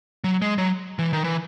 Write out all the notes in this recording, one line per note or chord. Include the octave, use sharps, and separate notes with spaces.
F#3
G#3
F#3
E3
D#3
E3